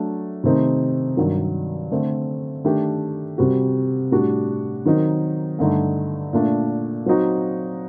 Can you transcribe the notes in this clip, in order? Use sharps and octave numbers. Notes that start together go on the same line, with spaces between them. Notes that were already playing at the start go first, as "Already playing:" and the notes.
Already playing: F#3 A3 D4
C3 D#3 A3 C4 D#4
G2 D#3 F#3
D3 A3 C4
D#3 A3 D4 G4
C3 G3 C4 F#4
A2 G3 D4 F#4
D#3 F#3 C4 D#4
G2 D3 A3 D#4
A#2 A3 D4
F#3 C4 D#4 F#4